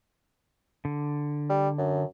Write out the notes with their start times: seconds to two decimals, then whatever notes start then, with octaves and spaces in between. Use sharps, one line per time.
0.85 D3
1.49 G3
1.78 F#2